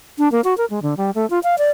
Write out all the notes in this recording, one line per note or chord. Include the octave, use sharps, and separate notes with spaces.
D4
A#3
F#4
A#4
G#3
D3
G3
A3
F4
F5
D5